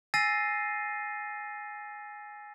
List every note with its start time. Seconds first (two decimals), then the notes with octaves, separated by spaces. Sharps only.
0.14 G#5 E6 A6 A#6 C7 D#7